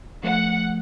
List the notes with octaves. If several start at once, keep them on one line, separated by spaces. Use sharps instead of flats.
F3 A3 F#5